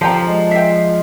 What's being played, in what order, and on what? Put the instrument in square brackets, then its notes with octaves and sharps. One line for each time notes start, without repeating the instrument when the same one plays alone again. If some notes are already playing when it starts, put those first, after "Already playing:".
[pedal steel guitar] F3 [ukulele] G4 G5 A#5 [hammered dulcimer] A4 D5 D6 [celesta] A5
[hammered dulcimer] G#3
[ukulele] E5 G5 [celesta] C7